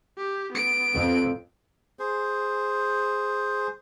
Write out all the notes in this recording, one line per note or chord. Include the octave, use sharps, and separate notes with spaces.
G4
B3 D7
F2
G#4 C5